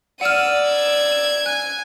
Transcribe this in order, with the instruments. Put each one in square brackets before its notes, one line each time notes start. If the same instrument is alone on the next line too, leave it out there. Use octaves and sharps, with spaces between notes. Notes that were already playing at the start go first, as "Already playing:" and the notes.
[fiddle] D5 E6 [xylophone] F#5 F6 [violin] D#7
[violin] G#6 D7
[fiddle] G#5 [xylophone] F#6